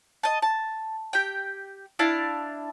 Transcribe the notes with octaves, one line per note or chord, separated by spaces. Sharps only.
D#5 A5
A5
G4 G5
D4 E4 F5 A5